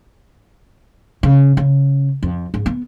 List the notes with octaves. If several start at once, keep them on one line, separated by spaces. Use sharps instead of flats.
C#3
C#3
F2
G#2
B3